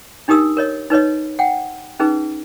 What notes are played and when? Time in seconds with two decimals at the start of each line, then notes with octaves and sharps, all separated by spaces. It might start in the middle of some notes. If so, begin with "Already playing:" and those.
0.28 D4 D#4 G4 A#4 D#6 E6
0.57 A#4 C#5 D#5
0.90 D#4 B4 C#5 D#5
1.39 F#5 G5
2.00 C#4 D#4 G#4 B4